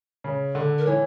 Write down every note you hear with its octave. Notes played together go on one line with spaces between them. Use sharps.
C#3
D3
A#4
E3 C#5